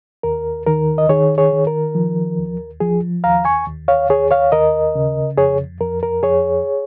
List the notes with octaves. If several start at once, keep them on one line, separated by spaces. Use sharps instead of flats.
D#2 A#4
D#3 A#4
D#5
D#3 G#4 C#5
G#4 C#5
D#3
A#4
F3
D#2
F3 G#4
D#2 F5 A#5
G#5 C#6
D#2
C#5 F5
D#2 G#4 C#5
C#5 F5
D#2 A#4 D#5
C#3
F2 G#4 C#5
F2 A#4
A#4
F2 G#4 C#5